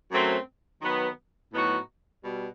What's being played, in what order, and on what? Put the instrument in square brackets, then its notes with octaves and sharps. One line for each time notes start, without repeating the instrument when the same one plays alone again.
[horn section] F#2 F#3 A3 C4
D#3 F#3 B3
A2 F#3 B3 D#4 F#4
B2 G3